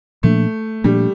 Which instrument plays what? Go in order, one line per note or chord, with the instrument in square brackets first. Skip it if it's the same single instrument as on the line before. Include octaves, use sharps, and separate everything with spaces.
[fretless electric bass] A#2 F3 A#3 D4 [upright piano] A3
[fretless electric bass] A#2 F3 A#3 D4 [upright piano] G3